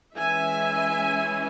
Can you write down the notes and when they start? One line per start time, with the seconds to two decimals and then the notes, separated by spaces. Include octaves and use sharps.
0.15 E3 G#3 C#4 E5 G#5